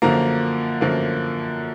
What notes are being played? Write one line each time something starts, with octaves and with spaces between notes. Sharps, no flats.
F#2 D3 F3 A#3 A#5
F#2 D3 F3 A#3